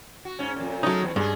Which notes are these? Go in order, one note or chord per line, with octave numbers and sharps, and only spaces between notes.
F#4
G#2 C#4
F2 A#2
F#3 G#3 A3 C#4 D#4
E2
G2 G#3 G#4